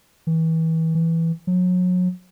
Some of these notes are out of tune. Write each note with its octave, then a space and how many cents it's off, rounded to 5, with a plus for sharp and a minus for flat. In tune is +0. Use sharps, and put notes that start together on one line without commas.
E3 -30
E3 +0
F#3 -35